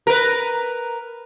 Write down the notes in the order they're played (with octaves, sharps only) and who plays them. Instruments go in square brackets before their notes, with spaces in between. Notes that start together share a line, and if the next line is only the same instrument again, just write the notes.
[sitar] A#4 B4